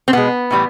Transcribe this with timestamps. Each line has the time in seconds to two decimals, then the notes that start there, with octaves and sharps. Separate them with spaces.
0.08 C4
0.13 B2 G#3 B3
0.51 A2 E3 G3